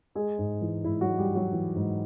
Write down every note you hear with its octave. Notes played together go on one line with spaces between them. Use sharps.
G#3 G#4
G#2
E3
G#2 E4
F#3 F#4
G#3
G3 G4
G#2
F#3 F#4
E3
G#2